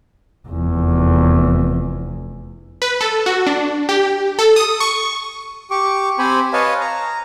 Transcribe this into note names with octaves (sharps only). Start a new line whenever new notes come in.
F1 E2
B4
A4
F#4
D4
G4
A4
D#6
C#6
G4 C#6 D6
C4 G4 C5 G#5 B5
B4 C#5 D#5 F5 G#5 A5
A#5